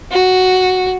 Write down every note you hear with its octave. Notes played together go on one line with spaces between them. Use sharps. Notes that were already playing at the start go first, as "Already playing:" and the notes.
F#4